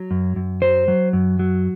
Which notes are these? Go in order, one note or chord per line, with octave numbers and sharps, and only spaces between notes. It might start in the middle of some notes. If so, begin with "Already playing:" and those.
Already playing: F#3
F#2
F#2
F#3 C5
F#3
F#2
F#3